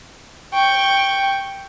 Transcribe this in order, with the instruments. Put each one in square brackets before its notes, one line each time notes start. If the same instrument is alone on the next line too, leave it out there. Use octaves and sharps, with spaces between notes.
[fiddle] G5 C#6